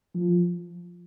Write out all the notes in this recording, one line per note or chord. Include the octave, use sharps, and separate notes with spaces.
F3